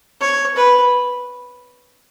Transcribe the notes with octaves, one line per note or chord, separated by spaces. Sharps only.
C#5
B4